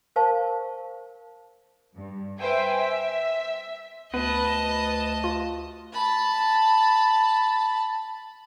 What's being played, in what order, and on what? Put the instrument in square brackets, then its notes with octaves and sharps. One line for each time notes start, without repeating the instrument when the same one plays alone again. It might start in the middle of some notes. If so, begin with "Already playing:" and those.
[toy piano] A#4 C5 F5 A5 C#6
[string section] G2
B4 C5 E5 G5 G#5
E5
[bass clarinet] D2 [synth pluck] B3 [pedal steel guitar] B4 [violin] D#5 A5
[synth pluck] F4
[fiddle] A5 B5